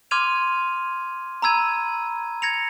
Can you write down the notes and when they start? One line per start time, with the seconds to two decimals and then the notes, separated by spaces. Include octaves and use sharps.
0.11 C6 D6 F6 G#6 D#7 F7
1.42 A#5 B5 E6 G#6 D#7
2.42 G#6 A#6 C#7 F7